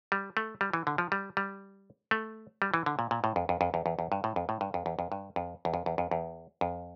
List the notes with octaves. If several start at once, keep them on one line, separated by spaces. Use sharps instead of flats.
G3
A3
G3
E3
D3
F3
G3
G3
A3
G3
E3
D3
A#2
A#2
A2
F2
F2
F2
E2
E2
E2
G2
A2
F2
A2
G2
F2
E2
F2
G2
F2
E2
F2
E2
F2
E2
F2